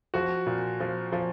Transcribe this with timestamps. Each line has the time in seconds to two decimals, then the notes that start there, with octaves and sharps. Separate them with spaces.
0.14 F3 F#4
0.46 A#2
0.80 F3
1.12 F3